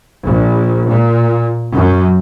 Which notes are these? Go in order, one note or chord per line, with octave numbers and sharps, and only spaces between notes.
A#1
A#2
F#2